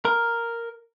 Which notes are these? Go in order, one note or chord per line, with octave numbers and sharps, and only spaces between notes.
A#4